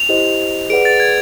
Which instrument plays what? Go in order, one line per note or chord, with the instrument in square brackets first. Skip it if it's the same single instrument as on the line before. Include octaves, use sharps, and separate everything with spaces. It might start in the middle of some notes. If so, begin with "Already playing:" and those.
Already playing: [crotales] F7
[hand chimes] E4 G4 C5 D#5
[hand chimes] G#4 B4 D5 F#5 [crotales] D7
[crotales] A6
G#6